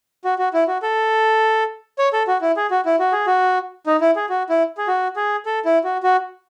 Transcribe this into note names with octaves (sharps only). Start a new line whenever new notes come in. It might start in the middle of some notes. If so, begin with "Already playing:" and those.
F#4
F#4
E4
F#4
A4
C#5
A4
F#4
E4
G#4
F#4
E4
F#4
G#4
F#4
D#4
E4
G#4
F#4
E4
G#4
F#4
G#4
A4
E4
F#4
F#4